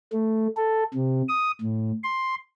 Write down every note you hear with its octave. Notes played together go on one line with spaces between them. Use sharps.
A3
A4
C3
D#6
A2
C6